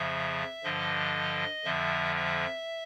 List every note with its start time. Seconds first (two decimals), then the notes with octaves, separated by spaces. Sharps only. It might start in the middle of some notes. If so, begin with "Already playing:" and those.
Already playing: F2 C#3 F3 E5
0.64 G2 D3 F3 D#5
1.64 F2 D3 F3 E5
2.16 E5